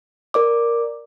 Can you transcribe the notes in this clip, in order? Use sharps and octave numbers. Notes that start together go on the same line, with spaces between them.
A#4 D5 D6